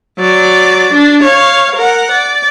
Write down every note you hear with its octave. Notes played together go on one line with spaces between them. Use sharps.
F#3 D5
D4
C#5 F5
A#4 F#5
D5